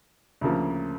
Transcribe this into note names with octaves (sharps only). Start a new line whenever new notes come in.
D2 C#3 F3 A#3